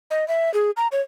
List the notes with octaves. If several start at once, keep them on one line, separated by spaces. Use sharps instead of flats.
D#5
E5
G#4
A#5
C#5